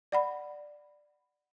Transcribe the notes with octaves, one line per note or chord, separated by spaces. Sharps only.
D5 F#5 B5